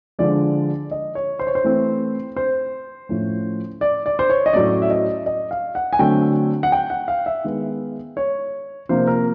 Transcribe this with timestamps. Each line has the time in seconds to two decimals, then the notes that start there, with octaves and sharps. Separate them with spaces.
0.19 D3 F3 G#3 D5
0.91 D#5
1.15 C#5
1.39 C5
1.47 C#5
1.55 C5
1.64 E3 A3 C4
2.36 C5
3.09 A2 F3 A3 C#4
3.81 D5
4.06 D5
4.19 C5
4.30 C#5
4.46 D#5
4.53 A2 F#3 A3 C#4 D5
4.82 E5
4.90 D#5
5.26 D#5
5.51 F5
5.75 F#5
5.93 G#5
5.99 D3 F#3 A3 C4 G5
6.63 F#5
6.72 G5
6.90 F#5
7.08 F5
7.26 E5
7.44 D#3 G#3 B3
8.17 C#5
8.89 C3 F3 A#3 C5
9.07 A#4